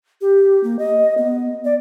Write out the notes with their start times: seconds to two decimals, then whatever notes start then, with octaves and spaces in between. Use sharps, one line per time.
0.21 G4
0.64 A#3
0.79 D#5
1.18 B3
1.65 D5